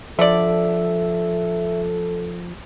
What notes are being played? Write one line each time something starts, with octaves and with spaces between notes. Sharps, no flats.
D3 F3 A4 D5 E5